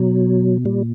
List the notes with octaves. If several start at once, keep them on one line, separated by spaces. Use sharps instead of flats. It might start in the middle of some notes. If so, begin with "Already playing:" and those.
Already playing: B2 F#3
A#2 G3